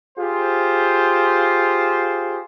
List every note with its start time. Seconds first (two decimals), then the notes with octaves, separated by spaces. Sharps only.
0.19 F4 G4 G#4 C5